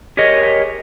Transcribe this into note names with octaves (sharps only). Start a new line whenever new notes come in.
G4 G#4 A#4 C#5 D#5